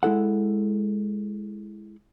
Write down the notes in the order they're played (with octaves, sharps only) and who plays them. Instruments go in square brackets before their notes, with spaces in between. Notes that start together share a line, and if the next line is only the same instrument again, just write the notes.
[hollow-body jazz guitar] G#3 E4 A4 F#5